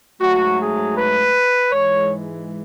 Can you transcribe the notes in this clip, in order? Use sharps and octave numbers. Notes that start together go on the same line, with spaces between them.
G#2 F#3 A3 F#4
G#4
B4
G#2 E3 G#3 C#5